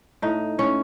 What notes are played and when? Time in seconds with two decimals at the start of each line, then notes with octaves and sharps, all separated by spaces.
0.22 A2 D#4
0.58 A2 C#4